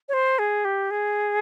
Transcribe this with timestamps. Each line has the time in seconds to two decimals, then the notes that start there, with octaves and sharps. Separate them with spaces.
0.09 C#5
0.13 C5
0.39 G#4
0.65 G4
0.91 G#4